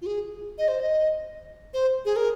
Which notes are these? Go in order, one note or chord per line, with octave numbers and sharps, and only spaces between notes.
F4
G#4
D#5
C5
D#5
C5
G#4
A#4